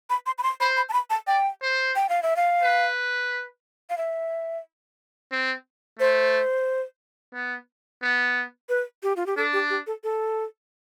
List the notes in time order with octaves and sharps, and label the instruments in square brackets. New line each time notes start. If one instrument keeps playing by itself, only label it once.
[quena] B5
C6
B5
C6
[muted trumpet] C5 [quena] B5
[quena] B5
A5
B5
A5
[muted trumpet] D5 [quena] G5
[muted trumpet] C5
[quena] G5
F5
E5
F5
[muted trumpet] B4
[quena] F5
E5
[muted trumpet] C4
[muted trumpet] A3 [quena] C5
[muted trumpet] B3
B3
[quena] B4
G4
F4
G4
[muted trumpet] D4 [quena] A4
[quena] G4
G4
A4
A4